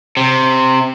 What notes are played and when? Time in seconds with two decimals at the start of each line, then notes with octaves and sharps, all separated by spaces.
0.17 C3